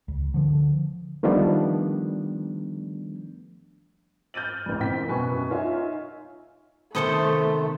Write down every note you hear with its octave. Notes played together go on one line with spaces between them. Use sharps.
C#2
D3 F3
D#3 F3 G3 A3 B3 D4
F6 G6 A6 D#7 F#7
A1 F2
A#2 E3 C4 G5 B6
F#2 B2 B4 G#5 C#6
D#4 F4 C#5 E5 G#5
C3 D#3 A3 B3 A4 C5 D#6